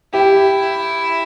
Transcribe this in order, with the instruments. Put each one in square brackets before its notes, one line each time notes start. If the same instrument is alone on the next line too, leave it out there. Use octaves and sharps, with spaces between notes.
[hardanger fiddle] E4 [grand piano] G4